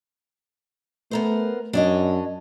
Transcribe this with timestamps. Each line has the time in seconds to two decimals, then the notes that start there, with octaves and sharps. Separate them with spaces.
1.11 A3 B3 A#4 C5
1.73 F#2 D4 C#5 D#5